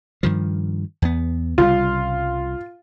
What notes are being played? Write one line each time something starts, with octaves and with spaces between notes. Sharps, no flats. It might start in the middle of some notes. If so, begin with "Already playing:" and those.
G2 D#3 F3
E2 B3
C2 C#3 G3 F4